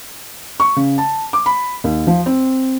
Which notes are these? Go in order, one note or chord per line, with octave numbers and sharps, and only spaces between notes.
C#6
C#3
A5
D6
B5
D#2
F3
C4